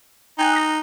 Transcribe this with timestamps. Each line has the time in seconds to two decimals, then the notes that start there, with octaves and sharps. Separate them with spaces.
0.39 D#4 G5 G#5 F#6
0.53 D#6 A#6